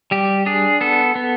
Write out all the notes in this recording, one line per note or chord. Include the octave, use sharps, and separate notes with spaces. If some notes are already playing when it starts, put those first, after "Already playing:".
G3 G4
D4 G#4
B3 A4
B3